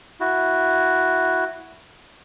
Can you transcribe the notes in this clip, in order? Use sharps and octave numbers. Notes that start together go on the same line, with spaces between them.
E4 F#4